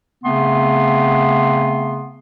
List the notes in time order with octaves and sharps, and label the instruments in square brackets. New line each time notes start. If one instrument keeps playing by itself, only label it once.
[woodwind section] C#3 A3 B3 C4 C6